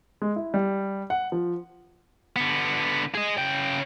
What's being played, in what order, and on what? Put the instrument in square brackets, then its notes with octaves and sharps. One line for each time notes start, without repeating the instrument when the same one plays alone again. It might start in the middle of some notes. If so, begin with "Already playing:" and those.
[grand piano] G#3
E4
G3
F#5
F3
[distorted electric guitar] D3 B3
G#4 D#5
C#3 G5